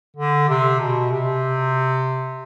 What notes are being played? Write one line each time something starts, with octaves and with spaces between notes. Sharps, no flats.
D3
C3
B2
C3